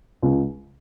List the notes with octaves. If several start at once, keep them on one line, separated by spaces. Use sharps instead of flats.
C#2